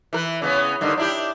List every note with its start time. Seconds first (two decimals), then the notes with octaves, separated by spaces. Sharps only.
0.13 E3 A#4 B4
0.42 C#3 B3 C#4
0.81 G2 D3 D#3
0.98 D4 E4 G4